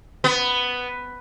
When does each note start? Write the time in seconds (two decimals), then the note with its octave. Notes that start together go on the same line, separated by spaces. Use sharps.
0.24 B3